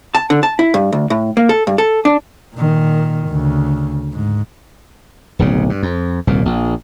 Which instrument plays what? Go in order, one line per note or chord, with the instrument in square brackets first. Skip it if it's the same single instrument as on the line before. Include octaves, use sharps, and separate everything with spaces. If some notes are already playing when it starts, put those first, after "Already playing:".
[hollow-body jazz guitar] A5
D3
A5
E4
G2
D2
A2
A#3
A4
G2
A4
D4
[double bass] A#2 D#3
D2 C#3
G#2
[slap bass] D1 B1 C#3
G2
F2
D#1 C2 A#2
A#1